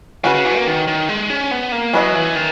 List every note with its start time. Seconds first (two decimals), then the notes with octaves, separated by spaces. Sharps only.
0.24 C#3 C#4 F#4 B4
0.35 C#3
0.45 E3
0.56 A#3
0.67 D#3
0.88 D#3
1.09 G#3
1.30 C#4
1.51 B3
1.72 A#3
1.93 F#3 C#4 E4 B4 D#5
2.15 E3
2.35 D#3